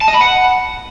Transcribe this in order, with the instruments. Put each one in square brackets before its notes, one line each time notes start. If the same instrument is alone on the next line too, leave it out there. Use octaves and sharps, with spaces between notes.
[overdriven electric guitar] A5
D#5
B5
F#5